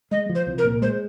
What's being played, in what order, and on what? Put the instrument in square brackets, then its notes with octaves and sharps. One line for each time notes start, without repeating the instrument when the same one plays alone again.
[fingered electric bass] G#3 [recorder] D#5
[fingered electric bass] F3
[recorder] C5
[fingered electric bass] C2
[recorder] A#4
[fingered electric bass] A#2
[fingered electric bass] G#3 [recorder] C5